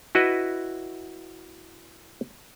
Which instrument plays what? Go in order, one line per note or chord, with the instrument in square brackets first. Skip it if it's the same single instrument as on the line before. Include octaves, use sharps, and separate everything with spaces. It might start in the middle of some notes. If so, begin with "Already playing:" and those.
[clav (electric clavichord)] E4 F#4 B4 D#5 E5